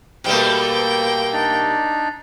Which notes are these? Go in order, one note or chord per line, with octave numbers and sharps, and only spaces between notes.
B2 G3 A3 A#3 G5
D4 D#4 D5